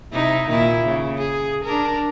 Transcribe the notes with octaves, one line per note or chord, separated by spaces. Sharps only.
C3 D#4 E4
A#2 D#3 E4
C#3
G#4
D4 A#4